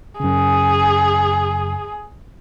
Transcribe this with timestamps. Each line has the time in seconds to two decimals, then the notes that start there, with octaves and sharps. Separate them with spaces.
0.20 F#2 C#3 G#4